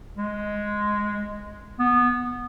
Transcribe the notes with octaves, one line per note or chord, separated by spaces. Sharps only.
G#3
B3